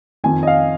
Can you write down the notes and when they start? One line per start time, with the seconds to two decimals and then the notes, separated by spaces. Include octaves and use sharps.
0.24 F2 D#3 G#5
0.43 D#5
0.47 F5